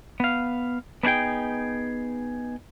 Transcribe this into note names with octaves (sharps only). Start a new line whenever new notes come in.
B3 F5
B3 D4 D#4 G#4 G5